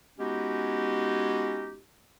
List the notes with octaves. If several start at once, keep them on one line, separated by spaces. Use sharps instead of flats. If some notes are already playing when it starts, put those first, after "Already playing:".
G#3 B3 C#4 D#4 F#4 G4